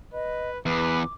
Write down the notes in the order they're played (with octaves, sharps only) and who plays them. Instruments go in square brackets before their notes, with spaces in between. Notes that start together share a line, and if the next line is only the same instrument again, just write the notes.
[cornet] B4 [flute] D#5
[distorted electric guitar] E2 [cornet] B4 [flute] D6